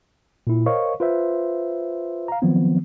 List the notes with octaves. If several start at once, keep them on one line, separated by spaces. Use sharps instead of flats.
A#2 E4
A#4 C5 C#5 D#5 F5 C#6
F4 B4 C5 E5
F5 A#5
D#3 F3 F#3 B3 C4